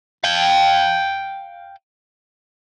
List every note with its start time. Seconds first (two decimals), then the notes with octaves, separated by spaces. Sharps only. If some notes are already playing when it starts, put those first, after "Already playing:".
0.24 F5 G5